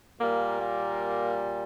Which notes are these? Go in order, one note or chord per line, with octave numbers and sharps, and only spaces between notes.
A#2 G3 A#3
A#3